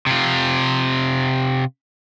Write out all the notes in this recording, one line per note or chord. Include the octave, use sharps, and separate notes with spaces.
C3 F4